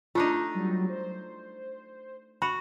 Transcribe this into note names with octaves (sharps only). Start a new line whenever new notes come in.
A3 D4 D#4 F4
F#3 G3
C5
F#4 B5